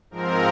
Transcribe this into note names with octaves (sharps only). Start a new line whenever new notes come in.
G#2 F3 C4 A#4